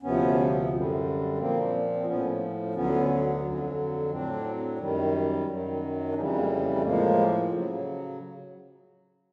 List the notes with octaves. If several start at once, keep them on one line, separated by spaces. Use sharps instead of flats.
D2 C3 F3 B3 C#4
F#2 D3 G3
A#2 F3 A#3 C4
C4
A2 F3 B3 C#4
D2 D3 F#3 B3 C#4
F2 D3 F#3
A2 F#3 C4 D4
F#2 D#3 G3
F#2 D#3 F#3
D4
F2 C#3 E3 G3 C#4 D#4
G#3 A#3
A#3 C4
A3
A2 F3 G#3 A#3
C#3 F#3